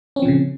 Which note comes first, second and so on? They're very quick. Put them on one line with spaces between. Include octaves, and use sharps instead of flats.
C#4 C4 F3 A#2 C#3